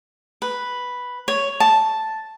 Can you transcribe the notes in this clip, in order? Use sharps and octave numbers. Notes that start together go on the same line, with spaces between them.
B4
C#5
A5